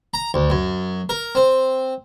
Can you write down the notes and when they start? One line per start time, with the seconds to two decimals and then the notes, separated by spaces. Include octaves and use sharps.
0.14 A#5
0.34 D2
0.50 F#2
1.09 A#4
1.35 C4